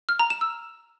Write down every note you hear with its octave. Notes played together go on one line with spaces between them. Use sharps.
F6
A#5
E7
E6